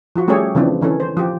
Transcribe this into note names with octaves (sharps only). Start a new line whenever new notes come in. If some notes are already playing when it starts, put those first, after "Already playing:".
F3 F4 F#4
G3 A3 C#4 G4 G#4 C#5
C#3 E3 F3 C4 D4
D#3 E3 C#4 A4
C5
F3 G4